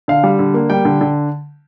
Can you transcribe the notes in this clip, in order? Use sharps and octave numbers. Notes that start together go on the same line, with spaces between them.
D3 F5
G3
D3
A#3
G3 G5
D3
D3